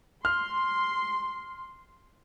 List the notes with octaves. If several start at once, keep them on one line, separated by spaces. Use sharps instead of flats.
C6 F6